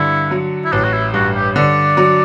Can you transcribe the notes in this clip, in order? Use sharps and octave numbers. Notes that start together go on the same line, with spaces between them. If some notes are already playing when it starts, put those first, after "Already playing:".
Already playing: G2 D3 E4
F#3
E4
A1 D4
F#4
E4
G2 F#4
G4
D3 D5
F#3